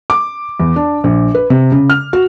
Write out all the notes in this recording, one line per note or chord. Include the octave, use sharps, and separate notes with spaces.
D6
E2
D4
A#1
B4
C3
C#3
F6
F#4